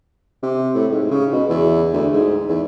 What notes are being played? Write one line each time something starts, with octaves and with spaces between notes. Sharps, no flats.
C3
A2
G#2
C#3
B2
E2
D2
G#2
E2